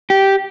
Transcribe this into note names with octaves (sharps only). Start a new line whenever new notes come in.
G4